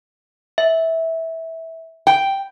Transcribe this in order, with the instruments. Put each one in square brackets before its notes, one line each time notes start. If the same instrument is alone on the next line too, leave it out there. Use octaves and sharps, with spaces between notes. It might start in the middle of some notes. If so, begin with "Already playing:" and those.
[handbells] E5
[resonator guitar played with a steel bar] G5